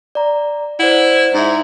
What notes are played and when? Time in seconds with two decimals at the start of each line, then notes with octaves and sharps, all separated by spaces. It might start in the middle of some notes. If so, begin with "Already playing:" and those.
0.15 D5 A#5
0.79 E4 C5 D5 F#5
1.34 G#2 D#4 E5